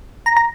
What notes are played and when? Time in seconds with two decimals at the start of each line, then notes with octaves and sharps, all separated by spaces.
0.26 A#5
0.37 A#5